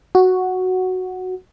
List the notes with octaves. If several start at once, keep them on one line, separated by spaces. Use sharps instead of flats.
F#4